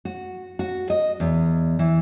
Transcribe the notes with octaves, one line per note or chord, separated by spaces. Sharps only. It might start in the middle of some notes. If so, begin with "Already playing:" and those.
F#4
F#4
D#5
E2
E3